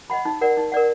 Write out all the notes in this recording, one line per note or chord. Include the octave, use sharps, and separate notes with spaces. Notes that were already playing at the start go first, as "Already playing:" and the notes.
D#5 F#5 B5
D#4
A#4 D5 F#5
D#4
A#4 D5 F#5